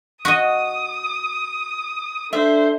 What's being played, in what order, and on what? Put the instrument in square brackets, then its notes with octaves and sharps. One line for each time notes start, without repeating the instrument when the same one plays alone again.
[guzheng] F#4 D#5 [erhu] D#6
[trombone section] D4 A4 [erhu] C5 [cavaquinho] E5